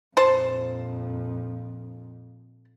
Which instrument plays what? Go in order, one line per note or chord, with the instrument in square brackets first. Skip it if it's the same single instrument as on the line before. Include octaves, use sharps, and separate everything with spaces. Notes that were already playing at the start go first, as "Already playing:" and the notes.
[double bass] A#1 F2 [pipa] C5 A5